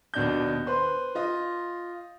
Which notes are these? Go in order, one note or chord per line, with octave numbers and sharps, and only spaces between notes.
D#2 B2 D4 G6
B4 C5 C6
F4 D#5